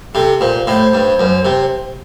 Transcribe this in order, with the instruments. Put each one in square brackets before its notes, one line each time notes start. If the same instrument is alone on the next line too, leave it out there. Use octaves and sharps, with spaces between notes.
[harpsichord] C3 [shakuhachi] A4
[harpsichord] A#2 [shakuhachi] C5
[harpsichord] A2 [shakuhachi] C5
[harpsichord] G2
F#2
C3